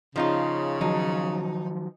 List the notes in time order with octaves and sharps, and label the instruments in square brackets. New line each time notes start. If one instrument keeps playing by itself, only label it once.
[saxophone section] C#3 [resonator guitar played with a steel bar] F3 D#4 F4
[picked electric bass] D#3 F3 F#3 [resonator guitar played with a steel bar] D#4